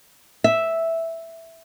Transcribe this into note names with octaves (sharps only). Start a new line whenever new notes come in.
E5